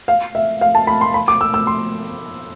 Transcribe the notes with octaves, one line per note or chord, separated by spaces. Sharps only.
F5
E5
F5
A5
B5
C6
B5
D6
E6
E6
C6